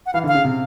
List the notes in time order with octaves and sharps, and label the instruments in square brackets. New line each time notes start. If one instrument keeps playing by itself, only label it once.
[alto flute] F#5
[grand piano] E3 [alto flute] F5
[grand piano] D3
[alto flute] F5
[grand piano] C#3
C3